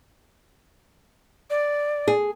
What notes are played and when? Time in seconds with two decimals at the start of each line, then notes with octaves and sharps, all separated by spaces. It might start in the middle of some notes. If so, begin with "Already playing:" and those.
1.50 D5
2.08 G#4